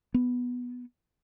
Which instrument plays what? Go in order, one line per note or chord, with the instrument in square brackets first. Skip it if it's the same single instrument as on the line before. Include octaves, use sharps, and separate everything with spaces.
[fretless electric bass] B3